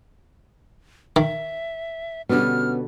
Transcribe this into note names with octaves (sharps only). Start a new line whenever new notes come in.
D#3 E5
B2 D3 G3 B3 C#4 F6